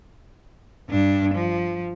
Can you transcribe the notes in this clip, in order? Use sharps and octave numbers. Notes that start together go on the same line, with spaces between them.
G2 D4
F3